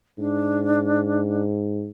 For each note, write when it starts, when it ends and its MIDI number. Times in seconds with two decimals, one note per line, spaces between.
0.18 1.91 44
0.18 1.45 62